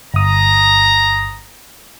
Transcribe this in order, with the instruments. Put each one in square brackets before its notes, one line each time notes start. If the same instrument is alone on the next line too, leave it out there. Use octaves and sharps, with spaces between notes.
[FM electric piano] G1 D#6 [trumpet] A#5